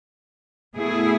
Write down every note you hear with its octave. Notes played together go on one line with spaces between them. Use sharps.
B2 A3 E4 G#4